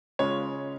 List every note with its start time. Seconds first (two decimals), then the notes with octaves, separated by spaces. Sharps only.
0.19 C#3 G#3 C#4 F4 C#5